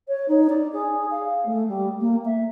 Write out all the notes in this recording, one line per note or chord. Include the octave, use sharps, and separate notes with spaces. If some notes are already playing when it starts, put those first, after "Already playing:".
C#5
D#4
D5
G#4
F5
A3
G3
A#3
E5